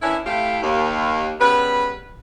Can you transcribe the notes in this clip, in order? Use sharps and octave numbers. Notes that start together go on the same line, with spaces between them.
D#3 E3 C#4 D4 E4
A2 A3 C4 E4 G4 F5
D#2
C#3 G3 B3 B4